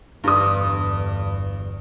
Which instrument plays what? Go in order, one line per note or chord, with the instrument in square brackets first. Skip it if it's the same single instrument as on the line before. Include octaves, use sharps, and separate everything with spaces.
[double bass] G1 E2 [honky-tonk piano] G2 D#6